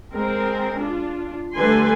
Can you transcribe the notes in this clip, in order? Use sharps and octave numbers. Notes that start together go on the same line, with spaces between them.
G#3 C4 A#4
D4 F4
D3 G3 A3 B4 G#5 C6